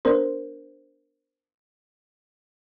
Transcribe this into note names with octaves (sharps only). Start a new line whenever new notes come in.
B3 D4 A#4 C5